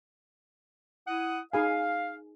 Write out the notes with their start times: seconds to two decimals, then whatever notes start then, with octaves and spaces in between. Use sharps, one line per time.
1.08 E4 F#5 D#6
1.53 D#4 G#4 F5 G#5